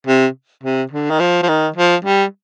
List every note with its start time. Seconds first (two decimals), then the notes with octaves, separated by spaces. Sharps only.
0.07 C3
0.63 C3
0.92 D3
1.10 D#3
1.20 F3
1.42 F3
1.48 D#3
1.76 F3
2.05 G3